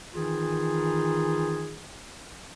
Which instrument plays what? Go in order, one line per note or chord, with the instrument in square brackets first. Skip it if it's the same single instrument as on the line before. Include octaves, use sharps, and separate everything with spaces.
[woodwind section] D#3 E3 D#4 F4 G#4